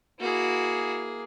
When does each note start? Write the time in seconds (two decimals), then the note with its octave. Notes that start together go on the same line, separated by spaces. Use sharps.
0.20 A#3 E4 F#4 G#4